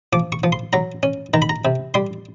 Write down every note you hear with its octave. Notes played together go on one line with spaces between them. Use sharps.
F3 D6
C#6
F3
C6
F#3 A#5
C#4
D#3 A#5
B5
A#5
C3
G3 C6